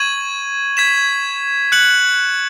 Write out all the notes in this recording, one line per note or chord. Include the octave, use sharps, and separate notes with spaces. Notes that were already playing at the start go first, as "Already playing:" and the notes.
Already playing: C#6 G#6 D#7 F#7
G#6 B6 E7
F#6 C#7 F#7